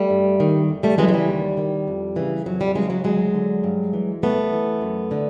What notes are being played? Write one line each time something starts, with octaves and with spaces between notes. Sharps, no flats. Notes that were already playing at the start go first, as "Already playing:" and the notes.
Already playing: G3 A3
G2
D#3
E2
G3 A3
C#3 E3 F#3 G#3
G#3
G3
D#2
D#3
F2
C#3 E3
F2 F#3
G3
C#3 E3 F#3 G#3
F#3 G#3
D2 F#3 G#3
D3
G2
E3
G2 A3 B3
E3
F#2
D3